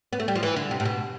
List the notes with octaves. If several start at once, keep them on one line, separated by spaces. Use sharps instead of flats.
B3
A3
G3
F3
E3
D3
C3
A2
B2